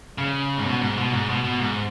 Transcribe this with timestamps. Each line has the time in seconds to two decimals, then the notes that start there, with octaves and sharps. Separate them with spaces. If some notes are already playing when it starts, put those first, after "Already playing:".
0.18 C#3
0.58 G#2
0.65 B2
0.81 G#2
0.97 B2
1.13 G#2
1.29 B2
1.44 B2
1.60 G#2